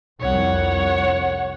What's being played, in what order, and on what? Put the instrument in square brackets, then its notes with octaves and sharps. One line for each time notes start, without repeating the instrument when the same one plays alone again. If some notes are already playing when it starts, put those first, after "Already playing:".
[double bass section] C2 F2 [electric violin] C#5 F#5